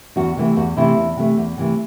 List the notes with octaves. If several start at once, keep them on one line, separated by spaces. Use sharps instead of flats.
E2 F#4
C3 E3 A3
E2 F#4
C3 E3 A3 E4
E2
C3 E3 A3
E2
C3 E3 A3